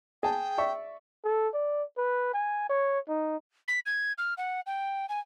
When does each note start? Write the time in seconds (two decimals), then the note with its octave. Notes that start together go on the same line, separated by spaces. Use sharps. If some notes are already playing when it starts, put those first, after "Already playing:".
0.23 G#4 G5 A5
0.58 D5 E5 C#6
1.24 A4
1.54 D5
1.97 B4
2.34 G#5
2.69 C#5
3.08 D#4
3.68 B6
3.86 G#6
4.18 F6
4.38 F#5
4.66 G5
5.09 G#5